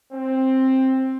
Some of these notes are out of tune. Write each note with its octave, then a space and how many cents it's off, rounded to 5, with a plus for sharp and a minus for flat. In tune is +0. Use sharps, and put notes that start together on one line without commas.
C4 +10